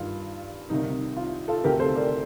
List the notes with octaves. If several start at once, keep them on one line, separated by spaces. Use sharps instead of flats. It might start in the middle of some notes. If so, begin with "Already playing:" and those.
Already playing: G2 D#3 F4
C2 C3 D#3 D#4
F4
F4 A4
D2 C3 D#3 G4 A#4
A4 C5
A#4 D5